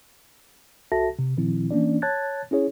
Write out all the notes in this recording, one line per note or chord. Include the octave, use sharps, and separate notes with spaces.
C2 F#4 A4 E5 A5 A#6
C3
A#2 D#3 F3 C4 E4
E3 A#3 C#4 D4 D5
C#5 A5 F#6 G#6 A6
C#4 E4 G#4 C#5